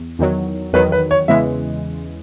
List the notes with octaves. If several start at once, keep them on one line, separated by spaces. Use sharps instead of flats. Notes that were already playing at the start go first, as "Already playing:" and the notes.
Already playing: E2
E2 D#3 F#3
E2 D#3 F#3 B4
B4
C#5
E2 C#3 E3 G#3 E5